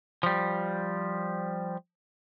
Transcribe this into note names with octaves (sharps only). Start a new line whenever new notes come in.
F3 G3